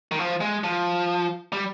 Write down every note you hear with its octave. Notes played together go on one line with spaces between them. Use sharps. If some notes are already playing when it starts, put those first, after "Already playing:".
D#3
F3
G#3
F3
G3